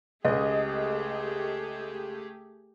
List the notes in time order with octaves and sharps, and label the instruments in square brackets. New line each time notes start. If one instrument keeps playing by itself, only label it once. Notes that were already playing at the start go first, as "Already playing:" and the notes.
[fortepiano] C#2 [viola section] A3 G4 G#4 [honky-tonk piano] D#5